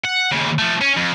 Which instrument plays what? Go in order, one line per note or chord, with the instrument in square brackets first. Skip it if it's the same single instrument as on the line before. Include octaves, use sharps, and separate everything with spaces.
[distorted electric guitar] F#5
D#2 C#3
F3 A3
C#4
F2